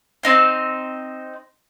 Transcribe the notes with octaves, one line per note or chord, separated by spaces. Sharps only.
C4 D#4 C5